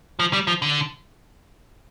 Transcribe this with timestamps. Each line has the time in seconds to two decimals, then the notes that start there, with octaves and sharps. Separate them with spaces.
0.19 F3
0.33 G3
0.47 F3
0.62 D3